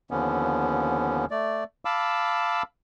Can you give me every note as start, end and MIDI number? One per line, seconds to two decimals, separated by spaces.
0.11 1.26 39
0.11 1.26 50
0.11 1.26 53
0.11 1.26 59
0.11 1.26 61
1.31 1.64 57
1.31 1.64 74
1.85 2.63 77
1.85 2.63 81
1.85 2.63 83
1.85 2.63 86
1.85 2.63 88